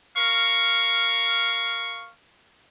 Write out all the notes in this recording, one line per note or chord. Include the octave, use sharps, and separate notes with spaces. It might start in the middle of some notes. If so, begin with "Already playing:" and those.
A#4 F5 C#6